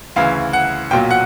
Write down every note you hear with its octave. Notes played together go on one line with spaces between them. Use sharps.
D2 C#3 E3 F5
F#5
B1 A#2 F#3 G5
F#5